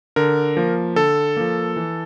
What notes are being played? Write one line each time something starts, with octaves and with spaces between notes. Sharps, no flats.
D3 A#4
F3 A#3
D3 A4
F3 A#3
E3